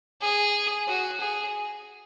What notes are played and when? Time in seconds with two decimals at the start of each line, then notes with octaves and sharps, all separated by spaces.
0.21 G#4
0.88 F#4
1.21 G#4